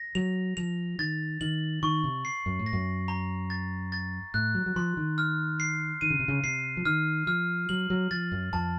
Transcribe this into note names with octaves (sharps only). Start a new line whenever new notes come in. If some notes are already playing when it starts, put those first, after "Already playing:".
Already playing: A#6
F#3 F7
F3 F7
D#3 A6
D#3 F#7
D#3 C#6
C3
C7
F#2
A2
A#6
F#2
A#5
A6
A6
A2 F#6
F#3
F#3
F3 C6
D#3
F6
C7
D#3 D#7
C#3
C3
C#3
C3 C7
F3
D#3 F6
F3 F6
F#3 F#7
F#3
F3 A6
F#2
F2 A5